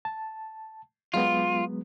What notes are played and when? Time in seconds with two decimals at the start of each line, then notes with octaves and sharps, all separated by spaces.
0.05 A5
1.14 F#3 G#3 B3 F4